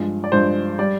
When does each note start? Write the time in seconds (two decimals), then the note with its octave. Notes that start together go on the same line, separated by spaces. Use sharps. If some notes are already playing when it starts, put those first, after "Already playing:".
Already playing: G2 F3 G#3
0.24 D5
0.32 G2 F3 G#3 C5
0.78 G3 D5